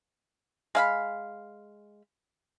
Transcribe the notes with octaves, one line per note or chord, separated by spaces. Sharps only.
G#3 F5 B5